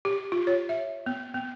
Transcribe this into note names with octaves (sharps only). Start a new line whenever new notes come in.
G4
F4
C#5
E5
B3
B3